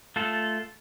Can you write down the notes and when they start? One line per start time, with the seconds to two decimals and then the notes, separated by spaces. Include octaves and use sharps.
0.16 A3 F4 A4